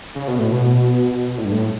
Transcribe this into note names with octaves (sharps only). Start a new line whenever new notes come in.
C#3
B2
A2
B2
A2
G2
A2